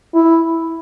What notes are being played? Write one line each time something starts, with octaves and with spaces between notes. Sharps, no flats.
E4